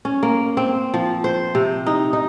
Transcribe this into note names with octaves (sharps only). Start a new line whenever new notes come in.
C#4
A#3
C4
F3
C5
C3
D#4
D#4